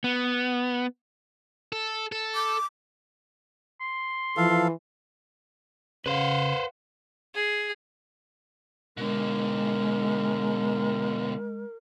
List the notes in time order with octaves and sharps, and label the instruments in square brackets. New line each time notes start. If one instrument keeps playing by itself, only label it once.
[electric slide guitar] B3
[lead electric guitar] A4
A4
[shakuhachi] D6
[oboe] C6
[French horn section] E3 [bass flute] F3 [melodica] A4 F5
[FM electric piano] C#3 [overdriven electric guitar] B4 C5 [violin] F5 F#5
[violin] G#4
[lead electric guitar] B2 D3 [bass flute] G#3 [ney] A#4